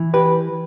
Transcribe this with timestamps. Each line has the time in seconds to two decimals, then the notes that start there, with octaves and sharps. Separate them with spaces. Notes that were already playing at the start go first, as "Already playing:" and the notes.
Already playing: E3
0.14 G4 B4